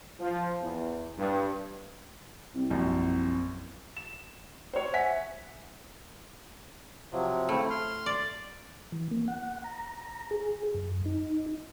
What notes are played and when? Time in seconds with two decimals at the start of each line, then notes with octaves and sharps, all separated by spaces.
0.20 F3
0.61 E2
1.17 G2
2.55 C2
2.70 A#1 F#2
3.97 E7
4.73 C5 C#5
4.93 E5 F#5 G#5 B6
7.12 C3 F3 F#3
7.49 C#3 A3 C4 E4
7.70 C6 F6
8.06 D5
8.92 E3
9.11 A#3
9.28 F#5
9.64 A#5
10.02 A#5
10.31 G#4
10.75 F#2
11.06 D#4